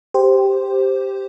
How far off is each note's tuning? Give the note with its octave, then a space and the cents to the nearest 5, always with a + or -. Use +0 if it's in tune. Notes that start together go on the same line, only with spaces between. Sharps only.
G4 +0 C5 +0